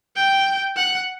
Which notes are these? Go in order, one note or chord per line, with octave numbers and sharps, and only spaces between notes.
G5
F#5